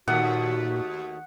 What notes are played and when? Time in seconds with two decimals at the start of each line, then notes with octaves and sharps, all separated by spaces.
0.08 D#2 A#2 A3 F#4 F#5